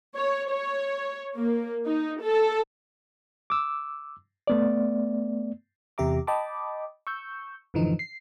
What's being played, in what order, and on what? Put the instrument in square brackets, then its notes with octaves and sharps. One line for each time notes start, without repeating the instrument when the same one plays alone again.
[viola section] C#5
C#5
A#3
D#4
A4
[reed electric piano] D6 E6
A3 B3 D5
[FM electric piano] E2 C3 G4 E5 A#5 D6
D#5 G5 A5 B5 D6
C#6 E6 G6
F#2 A2 D3 E3 F3 D#4
C7